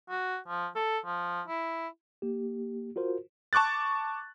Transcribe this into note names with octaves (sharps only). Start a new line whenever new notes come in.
F#4
F3
A4
F3
E4
A#3 G4
F4 F#4 A#4 C5
A5 C#6 D6 F#6 A6